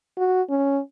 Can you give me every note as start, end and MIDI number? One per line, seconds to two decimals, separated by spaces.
0.18 0.42 66
0.50 0.79 61